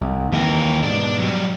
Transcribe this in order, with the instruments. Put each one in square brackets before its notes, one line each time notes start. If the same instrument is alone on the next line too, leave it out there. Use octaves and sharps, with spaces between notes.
[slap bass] C2
[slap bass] D#2 [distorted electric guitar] E3 A#4
[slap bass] G#2 B2 [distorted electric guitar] D4 D5
[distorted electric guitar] F#3 G3